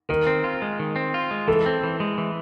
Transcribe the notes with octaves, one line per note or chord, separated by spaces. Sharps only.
D#3 A#4
C4
F4
G#3
D#3
C4
F4
G#3
E3 A4
C4
E3
G#3
E3